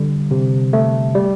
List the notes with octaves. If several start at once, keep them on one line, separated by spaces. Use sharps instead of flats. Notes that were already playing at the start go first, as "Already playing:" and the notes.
Already playing: D3 G3
C3
A3
G3